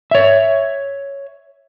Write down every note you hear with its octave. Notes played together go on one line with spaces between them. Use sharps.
C#5 E5